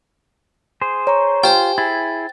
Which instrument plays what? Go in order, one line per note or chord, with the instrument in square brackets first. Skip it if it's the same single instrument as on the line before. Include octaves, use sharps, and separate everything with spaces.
[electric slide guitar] G#4 C5
[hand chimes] C#5 A#5 C#6
[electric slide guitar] F4 [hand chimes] G4 G#5 [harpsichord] C5 G5
[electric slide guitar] E4 G#4 [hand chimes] A6